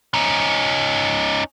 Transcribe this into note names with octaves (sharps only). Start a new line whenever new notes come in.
C#4 D#4